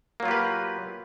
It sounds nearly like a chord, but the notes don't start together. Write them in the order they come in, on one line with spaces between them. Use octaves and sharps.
A#3 F#3 F4 G4 B4